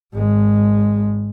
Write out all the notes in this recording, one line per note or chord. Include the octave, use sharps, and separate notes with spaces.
G#1 G#3